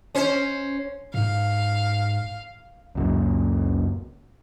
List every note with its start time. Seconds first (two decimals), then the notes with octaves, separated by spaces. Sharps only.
0.15 C#4 C5
1.14 G#2 F5
2.95 C#2 F#2 A#2